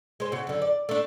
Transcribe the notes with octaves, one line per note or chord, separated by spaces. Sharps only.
G#3 C5
C#3 F#4
F#2 D3
D5
A3 D4